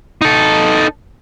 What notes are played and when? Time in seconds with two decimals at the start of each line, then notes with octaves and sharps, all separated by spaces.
0.22 D#4 A4